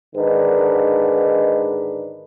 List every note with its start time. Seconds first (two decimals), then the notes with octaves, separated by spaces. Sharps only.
0.15 G#2 D3 D#3 D4 D#4 B4